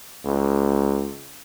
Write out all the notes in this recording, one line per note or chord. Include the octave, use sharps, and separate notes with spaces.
C#2